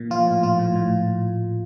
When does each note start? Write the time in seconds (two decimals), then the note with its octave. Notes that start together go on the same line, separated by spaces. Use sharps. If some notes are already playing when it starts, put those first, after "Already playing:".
Already playing: A#2
0.10 F3 F4
0.27 A2
0.43 F3 F4
0.59 A2
0.75 A2